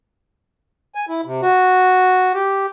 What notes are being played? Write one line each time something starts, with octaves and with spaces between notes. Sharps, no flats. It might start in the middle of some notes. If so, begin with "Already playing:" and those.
G#5
E4
C3
F#4
G4